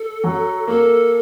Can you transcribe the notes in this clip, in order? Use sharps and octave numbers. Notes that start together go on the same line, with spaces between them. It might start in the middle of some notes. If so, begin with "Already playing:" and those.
Already playing: A4
F#3
A#3 A4